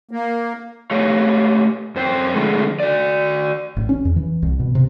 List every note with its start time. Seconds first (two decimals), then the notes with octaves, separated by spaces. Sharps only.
0.11 A#3
0.91 A3 G4 C#5 F5
1.96 F#2 C5 G5
2.34 D3 F3 G#3 A3
2.80 F#4 D5
3.77 A1
3.89 C#4
4.05 E2
4.16 E3
4.42 C2
4.59 B2
4.75 C3